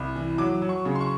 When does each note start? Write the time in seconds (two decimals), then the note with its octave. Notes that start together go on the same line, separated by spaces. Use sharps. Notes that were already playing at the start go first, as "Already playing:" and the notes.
Already playing: C2
0.15 E3
0.38 F#3 D6
0.62 F#3
0.69 C#6
0.85 C#3
0.95 C6
1.01 C#6